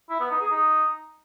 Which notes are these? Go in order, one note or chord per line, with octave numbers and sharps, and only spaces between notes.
E4
B3
D#4
G#4
D#4